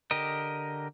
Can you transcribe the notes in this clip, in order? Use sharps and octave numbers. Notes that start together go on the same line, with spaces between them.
D3 G4 A#4 D#5